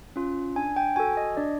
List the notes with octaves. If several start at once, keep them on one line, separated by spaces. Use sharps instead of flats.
C#4 F4
D4 G#5
G5
F#4 A4 G#5
D#5
D4 D5